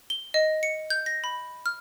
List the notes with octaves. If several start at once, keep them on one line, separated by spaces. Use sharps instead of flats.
G7
D#5
C#7
G6
A#6
B5
F6